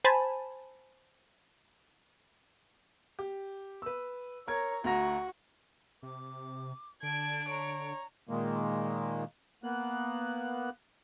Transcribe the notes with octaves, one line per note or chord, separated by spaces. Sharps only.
C5 G#5 A5 B5
G4
B4 E6
A#4 C#5 A#5 G#6
D2 F#4 A#5 A#6
C3 D6
D3 D4 A5 G#6 D7
C#5 A#5
A#2 D#3 G#3 A#3
A#3 B3 F#6